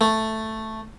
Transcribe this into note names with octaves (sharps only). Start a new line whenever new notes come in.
A3